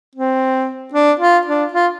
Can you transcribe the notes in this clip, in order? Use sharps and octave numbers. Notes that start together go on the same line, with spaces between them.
C4
D4
F4
D4
F4